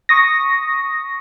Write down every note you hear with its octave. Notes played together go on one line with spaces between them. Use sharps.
C#6 D#6 A#6